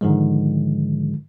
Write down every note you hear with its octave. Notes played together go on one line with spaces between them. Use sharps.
G#2 D3 D#3 F3 G#3